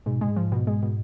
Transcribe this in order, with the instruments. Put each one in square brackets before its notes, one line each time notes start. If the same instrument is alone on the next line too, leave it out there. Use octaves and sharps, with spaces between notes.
[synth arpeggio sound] G#2 [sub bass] B2
[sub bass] B2 [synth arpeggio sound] G#3
[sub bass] G#2
[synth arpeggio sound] F3
B2
G#3
B2